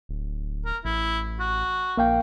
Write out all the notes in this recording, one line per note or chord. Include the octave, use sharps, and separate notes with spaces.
D1
A#4
A1 E4
F#4
A#1 A#3 F5 G5